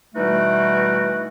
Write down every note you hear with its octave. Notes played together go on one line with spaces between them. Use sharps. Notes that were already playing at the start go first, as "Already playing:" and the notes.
B2 E3 G3 A3 D#4 F#4